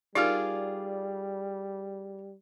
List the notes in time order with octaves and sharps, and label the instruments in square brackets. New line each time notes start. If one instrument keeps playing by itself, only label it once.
[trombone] G3 [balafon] D#4 G4 A#4 [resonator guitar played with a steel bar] F4 G#4 D5